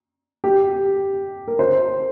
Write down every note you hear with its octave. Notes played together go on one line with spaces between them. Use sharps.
G4
A#4
C5